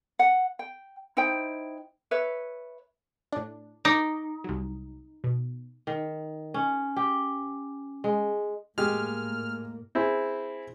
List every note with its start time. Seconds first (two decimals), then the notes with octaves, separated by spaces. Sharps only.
0.19 F#5
0.59 G5
1.17 D#4 E4 C5 G5
2.11 B4 C#5 E5
3.32 A2 D4
3.85 D#4 D6
4.44 C2 F#3
5.24 B2
5.87 D#3
6.54 C#4
6.96 G4
8.04 G#3
8.78 A2 G#3 A#3 G4 F6
9.95 C4 E4 G#4